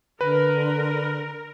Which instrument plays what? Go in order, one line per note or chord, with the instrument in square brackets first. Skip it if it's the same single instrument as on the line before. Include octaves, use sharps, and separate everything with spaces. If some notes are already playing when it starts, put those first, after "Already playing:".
[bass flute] D3 [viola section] A#4 [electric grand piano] B4